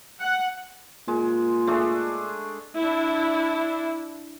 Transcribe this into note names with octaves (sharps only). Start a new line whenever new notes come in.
F#5
A#2 G#3
G#3 A3 D4
D4 E4